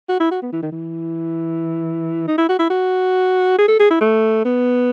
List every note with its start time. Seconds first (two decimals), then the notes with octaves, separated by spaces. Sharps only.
0.09 F#4
0.20 E4
0.31 F#4
0.42 B3
0.52 E3
0.62 D#3
0.72 E3
2.28 D#4
2.38 E4
2.49 F#4
2.59 E4
2.70 F#4
3.58 G#4
3.68 A4
3.79 G#4
3.90 E4
4.01 A3
4.45 B3